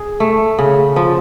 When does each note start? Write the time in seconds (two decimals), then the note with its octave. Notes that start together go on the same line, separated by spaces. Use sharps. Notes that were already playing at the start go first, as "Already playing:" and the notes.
Already playing: G#4
0.20 A3
0.59 C#3
0.96 F3